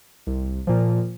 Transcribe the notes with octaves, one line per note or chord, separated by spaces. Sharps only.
C2
A#2 F3